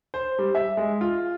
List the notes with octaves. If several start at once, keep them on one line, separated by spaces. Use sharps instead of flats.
C5
G3
E5
G#3
F4